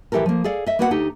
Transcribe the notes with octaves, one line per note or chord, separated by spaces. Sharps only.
A2 E3 E4 G4 A4 A#4
F3 A#3
G#4 A4 D5 F5
D#5 E5
A#3 B3 F#4 B4 C5 F#5
D2 D#4 G4 A4